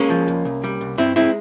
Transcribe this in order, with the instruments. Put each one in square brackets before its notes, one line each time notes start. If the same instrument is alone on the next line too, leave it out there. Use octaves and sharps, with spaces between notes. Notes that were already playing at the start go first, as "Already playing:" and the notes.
Already playing: [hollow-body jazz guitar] G#3 A#3 C#4
F3
C#2
C2
G3
C2
G2 C4 E4
G#3 C4 E4